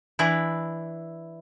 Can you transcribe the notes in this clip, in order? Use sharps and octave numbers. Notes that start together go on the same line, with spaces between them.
E3 D4 E4